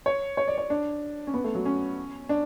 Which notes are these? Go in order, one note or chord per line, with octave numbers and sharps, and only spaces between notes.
C#5
C#5
D5
C#5
D4
C#4
B3
A3
F#3
C#4
D4